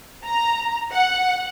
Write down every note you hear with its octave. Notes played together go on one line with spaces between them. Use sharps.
A#5
F#5